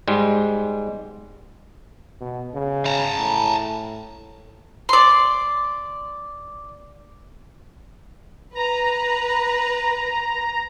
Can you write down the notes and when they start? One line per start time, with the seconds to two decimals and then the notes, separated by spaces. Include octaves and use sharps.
0.08 G#2 G3 G#3
2.20 B2
2.54 C#3
2.85 A5 A#5
3.20 A2
4.89 D5 C6
8.55 B4 A#5